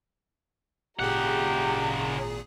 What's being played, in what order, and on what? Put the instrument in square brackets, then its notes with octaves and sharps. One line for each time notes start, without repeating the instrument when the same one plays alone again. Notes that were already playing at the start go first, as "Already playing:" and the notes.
[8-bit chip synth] G#1 A#2 G#4 [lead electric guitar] C#3 F#5 [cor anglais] G4 [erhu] A#5